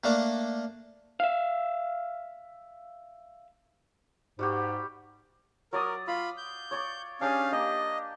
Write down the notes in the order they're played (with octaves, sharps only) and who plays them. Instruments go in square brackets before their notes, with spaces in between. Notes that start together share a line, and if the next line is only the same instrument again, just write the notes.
[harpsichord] A3 A#3 D4
[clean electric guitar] E5 F5
[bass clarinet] G#2 [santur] G3 F#4 G4
[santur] F#3 D5 D#6 [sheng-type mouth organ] A#4
[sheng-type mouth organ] F4 B5 [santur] F5
[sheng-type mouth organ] G6
[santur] C#5 D5 C#6
[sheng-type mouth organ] C#4 F5 [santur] D4 G4 G#4
[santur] A#3 G4 [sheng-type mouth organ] D#5